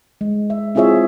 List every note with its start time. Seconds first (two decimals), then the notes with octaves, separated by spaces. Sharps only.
0.21 G#3
0.50 E5
0.75 C4 E4 F4 G#4 C#5 E5